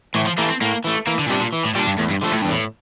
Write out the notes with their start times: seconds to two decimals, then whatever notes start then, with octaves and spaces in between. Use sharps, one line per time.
0.15 A2 E3
0.26 F3
0.38 E3 A3 A#3
0.50 C4
0.61 A2 A#3
0.84 E3 A3
1.07 E3 A#3
1.19 D3
1.26 A#2
1.29 C3 G3 D4
1.41 A#2
1.53 E3
1.65 A2
1.75 A#2 G3 D4
1.87 G2
1.98 E2 A2
2.11 G2
2.21 D3 F3 A3
2.33 A2
2.42 E2 G2
2.50 A2